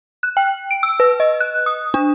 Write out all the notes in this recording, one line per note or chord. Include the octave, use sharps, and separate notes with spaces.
F#6
G5
D7
E6
B4
D#5
F#6
D#6
D4